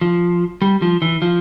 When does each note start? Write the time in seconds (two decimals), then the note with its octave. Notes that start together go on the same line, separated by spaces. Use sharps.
0.01 F3
0.62 G3
0.82 F3
1.02 E3
1.22 F3